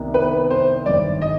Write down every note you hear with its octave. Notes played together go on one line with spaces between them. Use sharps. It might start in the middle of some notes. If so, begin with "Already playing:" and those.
Already playing: C2 C3 D#3 B3 D#4
B4
C5
G#1 G2 D#3 G3 D4 D5
D#5